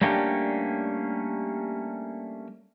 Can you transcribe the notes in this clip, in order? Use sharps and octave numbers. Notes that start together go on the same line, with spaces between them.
G3 A3 A#3 C#4 D4 G4